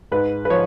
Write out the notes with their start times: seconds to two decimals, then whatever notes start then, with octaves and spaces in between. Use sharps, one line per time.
0.12 G#2 B4
0.45 B4
0.50 F3 C#5